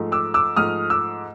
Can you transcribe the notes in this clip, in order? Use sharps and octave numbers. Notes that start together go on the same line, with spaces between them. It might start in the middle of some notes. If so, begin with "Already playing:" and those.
Already playing: G#2 F3 A3
D6 E6
D6 E6
G#2 F3 A3 D#6 F6
D6 E6